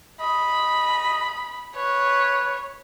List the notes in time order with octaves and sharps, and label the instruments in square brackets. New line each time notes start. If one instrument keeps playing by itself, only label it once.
[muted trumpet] D#5 [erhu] B5
[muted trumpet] B4 [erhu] C#5